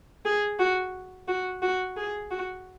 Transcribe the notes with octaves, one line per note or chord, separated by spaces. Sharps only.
G#4
F#4
F#4
F#4
G#4
F#4